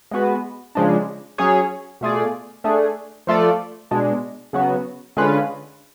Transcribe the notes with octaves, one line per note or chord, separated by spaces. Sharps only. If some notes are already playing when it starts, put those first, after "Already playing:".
G#3 B3 F#4 B4
C#3 F3 G#3 D4
F#3 C#4 G#4 C#5
B2 A3 F4 G#4 D5
A3 D4 G#4
F3 A3 F4 A4 D5
B2 G#3 D4
C#3 F#3 B3 F#4
D3 G#3 C#4 F4 B4